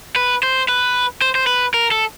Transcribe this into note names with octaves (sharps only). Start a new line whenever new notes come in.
B4
C5
B4
C5
C5
B4
A#4
A4